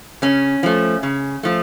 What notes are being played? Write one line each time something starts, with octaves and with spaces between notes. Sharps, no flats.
C#3 C#4
F3 A3
C#3
F3 A3